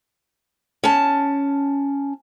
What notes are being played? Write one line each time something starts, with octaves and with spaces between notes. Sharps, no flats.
C#4 A5